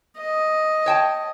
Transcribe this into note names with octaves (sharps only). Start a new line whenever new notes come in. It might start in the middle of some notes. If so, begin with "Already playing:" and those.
D#5
C#5 G5 A5